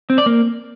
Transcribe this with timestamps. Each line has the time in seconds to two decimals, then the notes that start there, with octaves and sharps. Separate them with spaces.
0.10 C4
0.18 D5
0.26 A#3